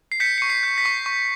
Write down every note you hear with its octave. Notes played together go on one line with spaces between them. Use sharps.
C7
G6 B6 C#7
C#6 C#7
C7
G6
B6
C#6
C#6